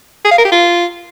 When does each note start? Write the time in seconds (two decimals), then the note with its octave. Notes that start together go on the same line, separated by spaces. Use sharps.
0.25 G#4
0.31 F5
0.38 A#4
0.45 G4
0.52 F4